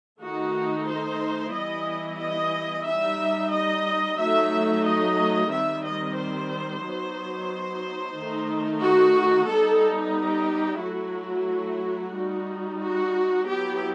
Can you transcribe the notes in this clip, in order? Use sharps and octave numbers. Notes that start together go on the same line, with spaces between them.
D#3 A3 D#4 F#4
C5
E3 G3 B3 E4 D#5
D#5
G3 D#4 E5
D#5
F#3 A3 D#4 E5
D#5
D#3 G3 C4 E5
D#5
C5
F#3 B3 D#4
D#3 A3 D#4
F#4
G3 B3 D#4 A4
G4
F#3 A3 E4 F#4
G3 D#4
F#4
F#3 B3 E4 G4